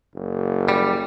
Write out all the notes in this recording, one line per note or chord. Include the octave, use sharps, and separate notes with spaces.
F#1
G3